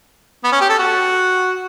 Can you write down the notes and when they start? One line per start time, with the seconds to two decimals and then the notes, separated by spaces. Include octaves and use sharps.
0.44 B3
0.52 C#4
0.61 G4
0.69 A4
0.78 F#4